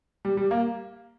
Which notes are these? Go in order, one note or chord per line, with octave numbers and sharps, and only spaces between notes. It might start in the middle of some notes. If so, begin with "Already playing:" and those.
G3
G3
A#3